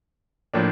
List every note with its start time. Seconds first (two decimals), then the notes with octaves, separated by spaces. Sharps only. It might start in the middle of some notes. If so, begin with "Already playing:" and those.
0.54 A2 F3 A#3 D4